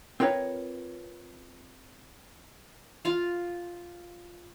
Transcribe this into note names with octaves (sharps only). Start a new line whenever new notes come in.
C4 F4 A#4 B4 C#5
F4 F5